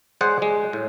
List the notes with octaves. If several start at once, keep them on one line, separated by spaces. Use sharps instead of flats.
G#3 G#4 C5 D5 F#5
G#3
A2